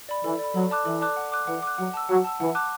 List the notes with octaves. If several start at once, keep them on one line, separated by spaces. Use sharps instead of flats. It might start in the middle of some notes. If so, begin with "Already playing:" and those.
D5 B5
E3 A4
D5 B5
F#3 A4
D5 A5 D6 F#6
E3 A4
D5 A5 D6 F#6
F#5
D6 F#6
E3 F#5
D6 F#6
F#3 F#5
A5 E6
F#3 F#5
A5 E6
E3 F#5
A5 D6 F#6